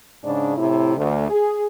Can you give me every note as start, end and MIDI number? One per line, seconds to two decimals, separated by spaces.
0.23 0.54 44
0.23 0.54 49
0.23 0.54 62
0.57 0.97 45
0.57 0.97 48
0.57 0.97 64
0.97 1.28 38
1.30 1.65 68